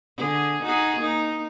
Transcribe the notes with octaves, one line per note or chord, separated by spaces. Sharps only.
D3 G#4
D#4 F#4 G#4
A#3 D#4